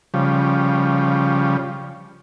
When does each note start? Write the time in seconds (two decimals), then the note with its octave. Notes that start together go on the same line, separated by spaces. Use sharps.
0.14 C#3 F3 G3